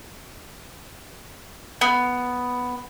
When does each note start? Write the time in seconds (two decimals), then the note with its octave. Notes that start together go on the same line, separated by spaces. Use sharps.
1.81 B3